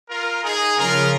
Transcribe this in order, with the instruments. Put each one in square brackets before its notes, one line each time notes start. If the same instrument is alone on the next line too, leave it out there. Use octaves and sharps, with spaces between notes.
[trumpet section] F4 A#4
D#4 G#4
[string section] C#3 F3 C#4 [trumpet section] F4 A#4